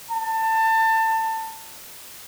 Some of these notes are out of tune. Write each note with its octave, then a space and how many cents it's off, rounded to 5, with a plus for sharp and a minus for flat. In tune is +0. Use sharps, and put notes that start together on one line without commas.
A5 +25